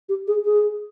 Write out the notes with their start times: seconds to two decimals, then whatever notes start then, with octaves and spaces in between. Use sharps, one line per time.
0.09 G4
0.27 G#4
0.45 G#4